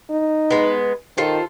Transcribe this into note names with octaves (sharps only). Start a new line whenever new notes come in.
D#4
G#3 B3
D#3 F4 A4 C5